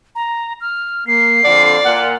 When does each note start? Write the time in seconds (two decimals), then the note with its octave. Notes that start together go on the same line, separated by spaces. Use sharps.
0.15 A#5
0.61 F6
1.07 A#3 C7
1.44 F2 D3 F3 D5
1.84 A#2 F4 F#5